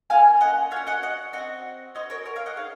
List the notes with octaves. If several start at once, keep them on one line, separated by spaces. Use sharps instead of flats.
A#3 C#4 F4 F5 G#5
D#5 F#5
C#4 C#5 F5
F#4
D#5 F#5
D#5 F#5
C4 F#4 D#5 F#5
C#4 F#4 C5 D#5
A#4 C#5
A#4 C#5
C#5 F5
D#5 F#5
D#4 G#4 C#5 F5